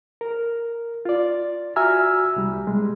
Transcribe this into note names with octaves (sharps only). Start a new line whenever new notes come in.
A#4
F4 D5
F#4 E5 G#5 A#5 E6 F6
C2 G3
B2 G3 G#3